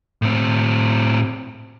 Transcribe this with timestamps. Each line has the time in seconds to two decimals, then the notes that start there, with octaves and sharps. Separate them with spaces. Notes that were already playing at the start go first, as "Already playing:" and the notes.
0.22 A2 C4